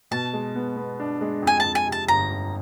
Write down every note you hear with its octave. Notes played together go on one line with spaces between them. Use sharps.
B2 A5
G#3
B3
B3
D4
G#3
F2 G#5
F2 A5
G#5
C3
A5
G1 A#5
G1